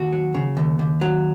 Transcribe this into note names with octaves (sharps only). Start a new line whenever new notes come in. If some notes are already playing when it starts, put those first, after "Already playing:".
Already playing: D#2 F#4
F#3
C#3
D#2
D#2
F#3